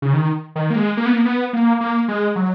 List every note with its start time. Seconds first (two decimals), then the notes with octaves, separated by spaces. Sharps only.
0.02 C#3
0.13 D#3
0.56 D#3
0.70 A#3
0.76 G#3
0.97 A#3
1.06 B3
1.13 A#3
1.25 B3
1.53 A#3
1.80 A#3
2.08 G#3
2.36 F#3